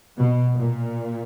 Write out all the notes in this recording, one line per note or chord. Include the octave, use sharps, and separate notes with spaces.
B2
A#2